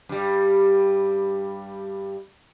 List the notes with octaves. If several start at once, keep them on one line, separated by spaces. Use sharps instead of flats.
G2 G3